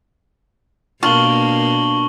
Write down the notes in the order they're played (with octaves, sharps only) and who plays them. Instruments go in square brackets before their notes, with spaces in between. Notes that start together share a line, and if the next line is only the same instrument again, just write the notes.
[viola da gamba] B2 A#3 [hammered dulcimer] D4 A#4 [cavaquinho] F4 [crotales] C#6 F#7 G7